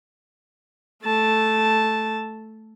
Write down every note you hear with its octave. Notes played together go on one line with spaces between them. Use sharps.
A3 A5